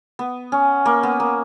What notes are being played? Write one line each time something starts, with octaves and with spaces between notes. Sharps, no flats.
B3
C#4
A#3
B3
A#3